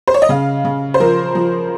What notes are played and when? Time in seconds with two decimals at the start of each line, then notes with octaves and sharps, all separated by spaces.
0.07 C5
0.14 C#5
0.22 D#5
0.29 C#3 F5
0.65 C#3
0.94 C5
1.00 F3 A#4
1.35 F3